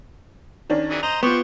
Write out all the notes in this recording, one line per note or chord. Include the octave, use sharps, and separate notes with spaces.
D#3 C#4 D4
E3 F#3 G#4
C5 D#5 A#5 F7
B3 F4 G4 C5 C#6